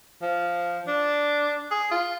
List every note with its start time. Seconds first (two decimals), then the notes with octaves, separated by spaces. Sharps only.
0.22 F3
0.87 D4
1.71 G#4
1.91 F4